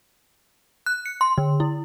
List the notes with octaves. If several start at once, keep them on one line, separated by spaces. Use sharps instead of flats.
F#6
C#7
C6
D3
E4